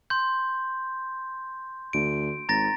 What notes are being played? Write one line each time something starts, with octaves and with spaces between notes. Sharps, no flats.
C6 G6
D2 D7
G#1 A#5 A6 A#6